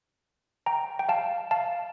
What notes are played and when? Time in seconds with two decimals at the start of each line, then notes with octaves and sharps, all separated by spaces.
0.66 G5 A#5
0.99 G5
1.09 F5 A5
1.51 F5 A5